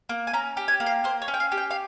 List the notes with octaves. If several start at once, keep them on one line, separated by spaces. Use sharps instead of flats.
A#3
G#5
C#4 A#5
G4
G#5
A#3
F5
A#3 C5
C#5
C#4
G5
F5
G4
G5
F5